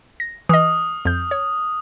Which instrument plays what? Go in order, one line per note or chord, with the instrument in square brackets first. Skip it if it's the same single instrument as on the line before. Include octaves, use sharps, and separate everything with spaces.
[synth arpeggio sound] A#6
[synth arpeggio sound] E3 D#5 [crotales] D#6 F6
[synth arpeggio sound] F2 G6
C#5